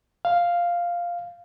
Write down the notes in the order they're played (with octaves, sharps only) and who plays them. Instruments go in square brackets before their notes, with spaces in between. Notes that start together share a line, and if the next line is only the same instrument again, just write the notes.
[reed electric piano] F5